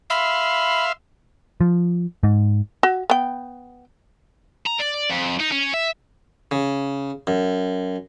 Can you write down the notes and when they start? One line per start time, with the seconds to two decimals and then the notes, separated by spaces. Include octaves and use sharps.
0.10 E5 F5 B5 C6
1.61 F3
2.23 G#2
2.83 F#4
3.10 B3 G5
4.66 A#5
4.79 D5
5.10 F2
5.40 D#4
5.52 C#4
5.74 E5
6.51 C#3
7.27 F#2